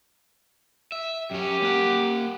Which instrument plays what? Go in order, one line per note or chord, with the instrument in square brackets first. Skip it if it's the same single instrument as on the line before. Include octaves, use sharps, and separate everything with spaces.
[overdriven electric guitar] E5
[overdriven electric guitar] F#2 C#4 [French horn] G4
[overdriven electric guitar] A#3 F#5